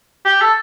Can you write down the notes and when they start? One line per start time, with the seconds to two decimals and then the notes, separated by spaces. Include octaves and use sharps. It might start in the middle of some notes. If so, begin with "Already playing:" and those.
0.25 G4
0.41 A4